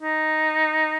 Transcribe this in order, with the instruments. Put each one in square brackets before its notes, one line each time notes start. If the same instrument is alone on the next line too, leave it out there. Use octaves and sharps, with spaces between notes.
[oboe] D#4